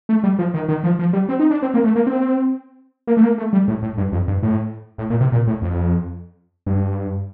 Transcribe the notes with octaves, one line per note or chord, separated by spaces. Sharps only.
A3
G3
F3
D#3
D#3
F3
F3
G3
C4
D#4
D4
C4
A#3
A3
A#3
C4
A#3
A3
A#3
A3
G3
A2
A2
G2
F2
G2
A2
A2
A#2
C3
A#2
A2
F2
G2